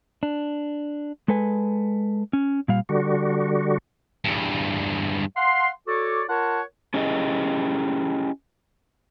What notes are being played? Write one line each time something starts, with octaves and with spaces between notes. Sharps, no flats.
D4
G#3 A4 B4 G#5
C#4
A#2 G3 F5
D3 G3 F#4
E2 G2
F5 F#5 C6
F#4 A4 C#5 D5 D6
F4 A#4 C#5 F#5 A5
C#4 E4 G4 G#4 D#5